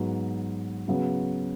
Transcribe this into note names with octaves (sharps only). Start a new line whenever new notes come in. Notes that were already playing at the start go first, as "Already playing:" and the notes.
Already playing: G#2 F#3 B3
C#3 F#3 B3